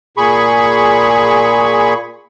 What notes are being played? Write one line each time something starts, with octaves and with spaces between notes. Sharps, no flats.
A#2 G#4 B5 C#6